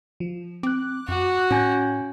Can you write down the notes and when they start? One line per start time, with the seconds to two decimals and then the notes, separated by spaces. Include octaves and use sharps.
0.20 F3
0.63 C4 D6 F#6
1.08 F#2 F#4
1.51 A2 C#4 G#5 G6